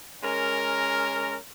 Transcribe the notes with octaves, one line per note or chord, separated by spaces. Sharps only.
G#3 C#4 A#4